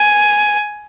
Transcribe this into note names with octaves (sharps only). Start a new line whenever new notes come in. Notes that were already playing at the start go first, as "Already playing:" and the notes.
Already playing: G#5